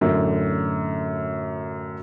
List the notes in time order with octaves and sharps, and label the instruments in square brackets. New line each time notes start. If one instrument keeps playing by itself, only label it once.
[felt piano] A1 F#2 D3